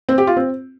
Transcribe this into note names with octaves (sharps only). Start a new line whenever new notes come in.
C4
G4
F4
C4